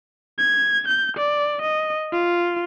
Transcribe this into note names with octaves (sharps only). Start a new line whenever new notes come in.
G#6
G6
D5
D#5
F4